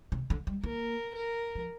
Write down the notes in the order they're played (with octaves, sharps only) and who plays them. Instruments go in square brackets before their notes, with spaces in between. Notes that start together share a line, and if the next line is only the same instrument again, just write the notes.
[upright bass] C3
D3
G3
[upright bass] A#3 [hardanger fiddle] A#4
[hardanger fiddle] A#4
[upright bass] F3